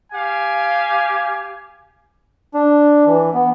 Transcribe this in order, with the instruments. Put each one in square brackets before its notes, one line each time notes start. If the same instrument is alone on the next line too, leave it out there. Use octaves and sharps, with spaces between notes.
[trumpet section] G4 F5 G#5
[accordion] D4
E3
B3